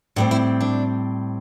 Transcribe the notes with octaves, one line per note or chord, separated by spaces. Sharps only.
A2 G3 C4 D4
E4
D4